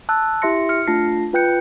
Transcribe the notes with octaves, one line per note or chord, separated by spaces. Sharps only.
A5 E6 F#6
E4 G4 E5 C6 A#6 C#7
F6 C#7
A3 D4 F4 A5 A#6 C7
F4 B4 G5 F#6 G6 C#7